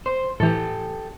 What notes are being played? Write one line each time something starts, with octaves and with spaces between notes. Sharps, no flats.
C5
A2 E3 G4 A4